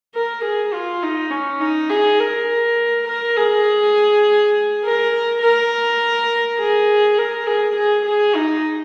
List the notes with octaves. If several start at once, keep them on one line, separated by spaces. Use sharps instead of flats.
A#4
G#4
F4
D#4
C#4
D#4
G#4
A#4
A#4
G#4
A#4
A#4
G#4
A#4
G#4
G#4
G#4
D#4